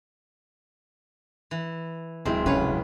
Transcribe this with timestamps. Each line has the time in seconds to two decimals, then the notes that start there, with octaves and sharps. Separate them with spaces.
1.51 E3
2.26 D1 G#3 C4 E4
2.46 F1 C#3 C#4 B4 C#5 F5